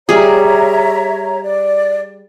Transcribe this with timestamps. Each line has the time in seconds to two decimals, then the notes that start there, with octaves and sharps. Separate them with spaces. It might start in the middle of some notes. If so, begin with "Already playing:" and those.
0.09 G3 G#4 C#5 E5 A#5
1.42 D5